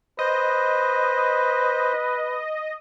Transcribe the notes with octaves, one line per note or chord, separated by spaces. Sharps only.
B4 C5 D#5